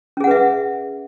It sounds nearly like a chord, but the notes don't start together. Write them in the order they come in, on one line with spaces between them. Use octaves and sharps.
C#4 G#4 F#5 B4 E5